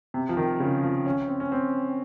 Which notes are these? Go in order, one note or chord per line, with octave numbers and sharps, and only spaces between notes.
C3
F3
D#3
C#3
F3
C#4
C4
C#4
C4